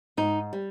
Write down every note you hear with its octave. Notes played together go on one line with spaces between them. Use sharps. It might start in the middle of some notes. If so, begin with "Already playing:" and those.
G#2 D#4
G3